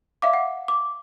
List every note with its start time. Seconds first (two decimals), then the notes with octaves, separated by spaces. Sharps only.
0.22 D5 E5 F5 D6
0.34 F#5
0.68 D6